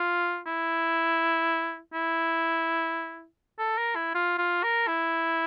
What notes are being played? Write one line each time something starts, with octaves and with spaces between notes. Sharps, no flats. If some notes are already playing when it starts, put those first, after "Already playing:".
Already playing: F4
E4
E4
A4
A#4
E4
F4
F4
A#4
E4